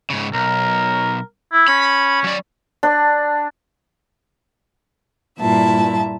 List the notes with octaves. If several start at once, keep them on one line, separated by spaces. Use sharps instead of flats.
G#2 C#3
B1 A#4
E4
C#4 B5
F#3 D5
D4
G2 A#2 E4 E5 A5